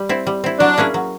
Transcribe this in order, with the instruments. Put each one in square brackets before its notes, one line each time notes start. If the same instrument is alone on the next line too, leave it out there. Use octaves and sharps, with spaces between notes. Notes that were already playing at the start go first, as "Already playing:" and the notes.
Already playing: [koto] G3
C4 E4
G3
C4 E4
[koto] F#3 [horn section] D4
[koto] A#3 C#4 E4 G#4
F#3